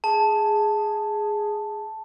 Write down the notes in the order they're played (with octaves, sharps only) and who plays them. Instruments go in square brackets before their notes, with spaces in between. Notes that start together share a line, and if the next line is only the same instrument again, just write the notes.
[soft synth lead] G#4 [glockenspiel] A5